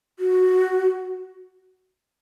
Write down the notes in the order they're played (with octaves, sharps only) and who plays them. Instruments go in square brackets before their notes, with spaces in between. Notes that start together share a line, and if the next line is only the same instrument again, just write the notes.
[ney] F#4